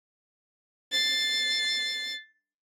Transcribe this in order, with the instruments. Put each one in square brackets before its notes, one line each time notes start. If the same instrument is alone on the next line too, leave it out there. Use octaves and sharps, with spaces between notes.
[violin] A6 C7